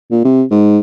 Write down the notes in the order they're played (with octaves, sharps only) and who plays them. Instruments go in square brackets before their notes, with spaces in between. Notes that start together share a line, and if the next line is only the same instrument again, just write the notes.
[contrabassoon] A#2
C3
G#2